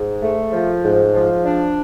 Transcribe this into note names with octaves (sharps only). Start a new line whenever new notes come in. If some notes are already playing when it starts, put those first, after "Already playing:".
Already playing: G#2
A3
F3
G#2
F3
D4